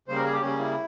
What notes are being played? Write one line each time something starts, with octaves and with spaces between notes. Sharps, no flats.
C#3 G3 A#3 C5
A#4
G#4
G4
C#3 G3 A#3 C#4
E4